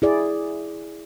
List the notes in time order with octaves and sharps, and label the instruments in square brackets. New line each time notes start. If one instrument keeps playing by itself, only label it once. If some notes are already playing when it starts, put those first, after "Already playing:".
[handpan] E4 G#4 D5